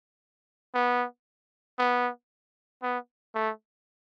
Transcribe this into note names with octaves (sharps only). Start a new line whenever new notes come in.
B3
B3
B3
A3